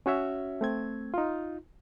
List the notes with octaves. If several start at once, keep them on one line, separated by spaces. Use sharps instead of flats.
C#4 F#4 C#5 E5
A3 C4 G#6
D#4 F4